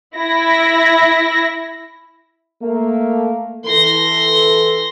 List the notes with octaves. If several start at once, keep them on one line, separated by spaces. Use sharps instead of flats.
E4 A#6
A3 A#3
E3 A4 C6 A#6